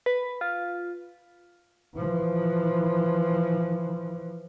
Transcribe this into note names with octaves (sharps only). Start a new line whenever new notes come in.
B4
F4
E3 F3